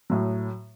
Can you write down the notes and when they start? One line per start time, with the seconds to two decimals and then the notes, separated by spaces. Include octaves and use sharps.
0.10 A2 F#3